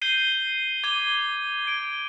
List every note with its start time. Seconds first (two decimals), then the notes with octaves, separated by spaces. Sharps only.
0.02 G6 C7 D#7 G7
0.84 D6 G#6 D#7 G7
1.66 G#6 D7 G7